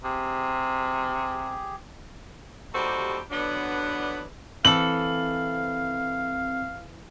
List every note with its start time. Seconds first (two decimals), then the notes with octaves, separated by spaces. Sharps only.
0.04 C3 G4 G#4
2.74 D#2 G3 F#4 G4 A4 C5
3.31 D3 E3 F#3 B3 D4
4.65 E3 C4 A4 F5 F#7